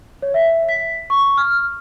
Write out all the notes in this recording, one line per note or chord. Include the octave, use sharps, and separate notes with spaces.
C#5
E5
B6
C#6
F6